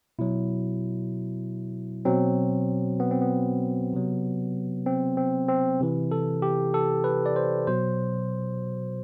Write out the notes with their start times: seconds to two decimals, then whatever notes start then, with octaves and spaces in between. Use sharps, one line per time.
0.19 B2 F#3 E4
2.05 B2 F#3 C4
3.00 B3
3.11 C4
3.22 B3
3.93 C3 F#3
4.86 C4
5.17 C4
5.48 C4
5.80 C3 E3
6.11 A4
6.42 G4
6.74 A4
7.04 B4
7.26 D5
7.36 C5
7.67 B2 F#3 C5